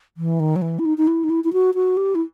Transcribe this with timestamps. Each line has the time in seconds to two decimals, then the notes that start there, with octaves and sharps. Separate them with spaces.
0.17 E3
0.40 D#3
0.56 F#3
0.62 E3
0.79 E4
0.85 D#4
0.98 D#4
1.07 E4
1.24 D#4
1.30 E4
1.44 E4
1.53 F#4
1.75 F#4
1.97 G4
2.15 E4